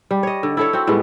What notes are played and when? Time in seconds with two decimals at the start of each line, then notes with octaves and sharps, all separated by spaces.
0.11 G3
0.23 C#5 D#5
0.43 D3
0.57 E4 A4 C#5
0.73 C4 F#4
0.87 A2 G3 G#3 B3